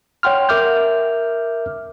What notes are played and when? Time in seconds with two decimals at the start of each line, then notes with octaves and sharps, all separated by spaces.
0.23 C#5 F#5 G5 C6 F6
0.49 A#4 E5 D6 F6 G6